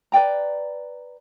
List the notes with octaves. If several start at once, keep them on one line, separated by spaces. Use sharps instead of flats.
B4 D5 G5 A#5